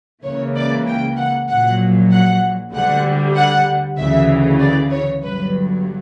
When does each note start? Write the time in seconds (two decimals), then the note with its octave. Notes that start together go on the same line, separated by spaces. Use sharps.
0.24 C#2 C#3 E3 A#3 C#5
0.55 D5
0.87 G5
1.17 F#5
1.49 A#1 A#2 F#3 F#5
2.12 F#5
2.73 D2 D3 G3 F#5
3.36 F#5
3.98 D2 C#3 E3 E5
4.60 D5
4.91 C#5
5.23 G1 G2 F#3 B4